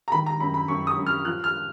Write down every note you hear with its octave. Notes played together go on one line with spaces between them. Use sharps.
A#5
D#3 B5
A#5
F#2 B5
B5
F#2 C#6
D#6
F#2
F6
F3 F#6
F6